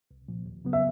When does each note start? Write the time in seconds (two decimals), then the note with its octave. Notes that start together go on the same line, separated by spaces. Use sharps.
0.11 C2
0.28 A#2 F3
0.46 D#2
0.65 C#3 F#3 B3
0.73 E5